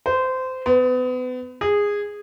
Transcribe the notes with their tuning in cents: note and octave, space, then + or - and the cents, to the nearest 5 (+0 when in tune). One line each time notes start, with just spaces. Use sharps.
C5 -20
B3 +35
G#4 -15